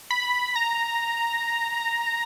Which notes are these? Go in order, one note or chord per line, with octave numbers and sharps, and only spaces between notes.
B5
A#5